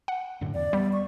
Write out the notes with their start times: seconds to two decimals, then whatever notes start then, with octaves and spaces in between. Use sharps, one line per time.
0.08 F#5
0.41 F#2 A2 D3
0.54 E2 D5
0.73 G3 B3
0.93 C#6